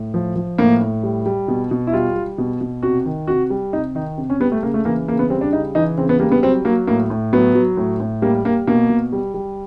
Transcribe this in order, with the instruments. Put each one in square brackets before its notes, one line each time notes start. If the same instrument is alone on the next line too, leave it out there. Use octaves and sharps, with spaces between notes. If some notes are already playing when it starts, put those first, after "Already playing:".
Already playing: [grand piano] A2
F3
F3
A2 A#3
A2
G3
G3
B2
B2
E4
G3 F4
G3
B2
B2
C3 F#4
D#3
C3 F#4
G3
C3 D#4
D#3 D#4
C3
C#4
G3 B3
A3
C#3 A#3
A3
E3 A#3
C#3 A#3
B3
G3 C4
D4
C#3 D#4
E3 D#4
C#3 C4
B3
G3 A#3
B3
F#3 C4
F#3 A#3
A2 A#3
A2
F#3 B3
F#3
A2
A2
G3 A#3
G3 A#3
B2 A#3
B2
G3
G3